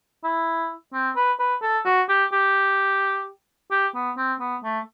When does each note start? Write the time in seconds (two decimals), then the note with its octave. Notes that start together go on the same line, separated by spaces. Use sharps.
0.24 E4
0.94 C4
1.16 B4
1.39 B4
1.62 A4
1.85 F#4
2.09 G4
2.32 G4
3.71 G4
3.95 B3
4.17 C4
4.40 B3
4.64 A3